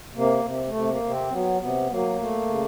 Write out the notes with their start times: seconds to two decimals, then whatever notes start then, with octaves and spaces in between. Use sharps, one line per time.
0.15 C3 A#3
0.44 C3
0.67 A3
0.74 C3
0.89 A#3
1.03 C3
1.10 C4
1.32 F#3 B3
1.61 C3 B3
1.90 F#3 A#3
2.19 A3
2.49 C#3